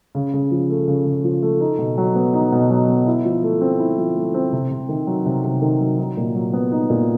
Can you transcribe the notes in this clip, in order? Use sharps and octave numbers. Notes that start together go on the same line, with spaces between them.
C#3
C#3
F3
A3
C#3
C#3
F3
A3
D#4
B2
F#3
B3
D#4
B2
F#3
B3
E4
F3
A3
C4
E4
F3
A3
C4
C3
C3
D#3
F#3
C3
C3
D#3
F#3
D#4
A#2
F#3
B3
D#4
A#2